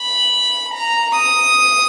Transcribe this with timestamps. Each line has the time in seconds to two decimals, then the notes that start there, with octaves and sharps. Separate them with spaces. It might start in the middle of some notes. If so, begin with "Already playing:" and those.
Already playing: B5
0.74 A#5
1.16 D#6